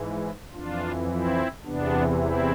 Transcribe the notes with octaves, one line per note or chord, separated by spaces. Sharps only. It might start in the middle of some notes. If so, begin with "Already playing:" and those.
Already playing: G#2 E3
F2 E3 D4 F4
C4 E4
E2 C3 E3 B3 D4
C4 E4